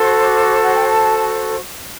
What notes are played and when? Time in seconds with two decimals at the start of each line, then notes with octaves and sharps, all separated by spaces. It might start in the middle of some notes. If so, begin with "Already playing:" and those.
Already playing: F#4 A4 C5 C6
0.20 D6
0.62 F#5
0.75 G5
0.88 A5